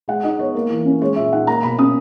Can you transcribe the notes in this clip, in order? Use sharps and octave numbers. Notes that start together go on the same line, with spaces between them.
G#3 F#5
D#4 D#5
B3 C#5
A#3
E3
C#4
G#3 C#5
A#2 E5
D#4 F#5
A#3 A#5
B2 B5
C#4 D#6